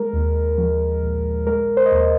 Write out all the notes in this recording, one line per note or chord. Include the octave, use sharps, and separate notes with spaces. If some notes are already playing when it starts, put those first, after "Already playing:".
Already playing: G#3 A#4
D#2
F3
A#1
G#3 A#4
C5
D#5
D#2 C5